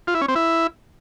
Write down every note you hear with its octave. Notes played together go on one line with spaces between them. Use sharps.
F4
E4
C#4
C4
E4